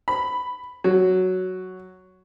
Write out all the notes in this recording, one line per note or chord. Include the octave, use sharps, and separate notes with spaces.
B5
F#3